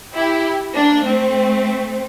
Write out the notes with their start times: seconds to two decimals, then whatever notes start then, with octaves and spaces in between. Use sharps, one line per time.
0.14 E4 G4
0.74 A#3 D4
1.04 A3 C4